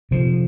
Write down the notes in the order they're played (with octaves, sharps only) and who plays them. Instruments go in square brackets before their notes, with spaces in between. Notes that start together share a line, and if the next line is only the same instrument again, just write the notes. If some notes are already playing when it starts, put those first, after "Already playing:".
[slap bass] C3 F3